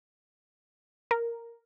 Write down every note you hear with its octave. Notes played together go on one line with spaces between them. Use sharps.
A#4